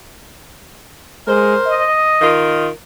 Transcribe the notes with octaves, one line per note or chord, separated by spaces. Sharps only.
G#3 A#4 C5
D#5
D#3 F4 A#4